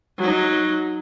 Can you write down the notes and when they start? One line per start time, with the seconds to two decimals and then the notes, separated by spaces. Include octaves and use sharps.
0.18 F#3 D#4